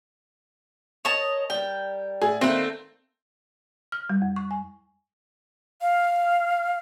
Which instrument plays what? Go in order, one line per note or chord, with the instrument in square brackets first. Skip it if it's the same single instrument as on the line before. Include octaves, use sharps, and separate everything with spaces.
[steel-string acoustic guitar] A#4 [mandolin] C#5 D#5 A5
[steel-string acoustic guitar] G3 A#4 [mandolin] G5
[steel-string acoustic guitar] A2 [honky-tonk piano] G#4
[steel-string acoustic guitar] D#3 A#3 E4 [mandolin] A3 F#6 [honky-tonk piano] C4
[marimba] F6
G3
F2
C#6
G#5
[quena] F5